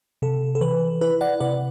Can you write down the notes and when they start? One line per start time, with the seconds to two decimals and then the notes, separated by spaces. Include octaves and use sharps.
0.22 C3 A4
0.55 A4
0.61 E3 B4
1.01 E4 B4
1.21 D5 F#5
1.40 C3 B4 D5